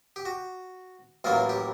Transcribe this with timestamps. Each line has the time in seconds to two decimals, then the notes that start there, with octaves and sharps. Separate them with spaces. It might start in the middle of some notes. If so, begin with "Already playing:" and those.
0.16 G4
0.25 F#4
1.24 A1 A2 F#3 A#3 F4
1.49 G4